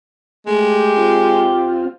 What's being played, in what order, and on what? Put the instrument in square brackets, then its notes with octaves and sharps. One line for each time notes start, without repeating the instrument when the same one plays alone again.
[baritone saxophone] G#3 [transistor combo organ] A3 [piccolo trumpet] G4
[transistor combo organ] C4 F4